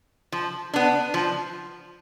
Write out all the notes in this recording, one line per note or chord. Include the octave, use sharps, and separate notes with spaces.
F3
B3 D4
F3